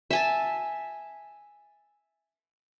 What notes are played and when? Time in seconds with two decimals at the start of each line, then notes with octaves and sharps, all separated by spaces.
0.10 E5 G#5 A5